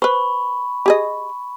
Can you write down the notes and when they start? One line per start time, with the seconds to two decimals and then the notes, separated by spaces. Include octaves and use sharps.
0.02 B4 C5 B5 C#6
0.86 G4 G#4 D#5